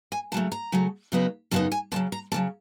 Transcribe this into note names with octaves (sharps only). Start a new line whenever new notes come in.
G#5
C#3 F#3 A3 A5
A#5
C#3 F#3 A3
F#2 C#3 F#3 B3 D#4
F#2 C#3 F#3 B3 D#4 A5
G#5
F2 C#3 F#3 A5
A#5
F2 C#3 F#3 A5